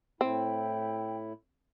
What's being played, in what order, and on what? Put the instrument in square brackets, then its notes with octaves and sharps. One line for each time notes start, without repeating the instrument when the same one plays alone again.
[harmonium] A2 E4 [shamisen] C4 [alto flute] G5